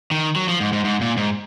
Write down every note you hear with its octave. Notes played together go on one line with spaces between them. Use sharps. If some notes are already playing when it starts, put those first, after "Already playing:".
D#3
F#3
F3
G#2
G#2
G#2
A#2
G#2